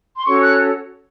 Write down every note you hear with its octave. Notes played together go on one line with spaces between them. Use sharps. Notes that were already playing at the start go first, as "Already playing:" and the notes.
C6
C#4 F#4 A4 C#5 C#6
F#6